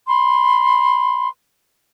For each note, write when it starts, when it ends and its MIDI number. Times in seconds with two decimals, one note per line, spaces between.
0.08 1.28 83
0.08 1.28 84